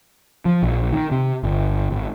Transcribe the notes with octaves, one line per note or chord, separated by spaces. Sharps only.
F3
A#1
D#3
C3
G1
G#1